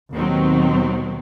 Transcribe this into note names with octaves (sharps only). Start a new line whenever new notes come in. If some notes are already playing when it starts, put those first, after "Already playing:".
D#2 B2 D#3 F#3 C4